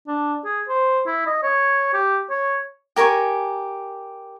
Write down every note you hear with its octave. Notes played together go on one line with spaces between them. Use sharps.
D4
G#4
C5
E4
D#5
C#5
G4
C#5
G4 A#4 G#5 C#6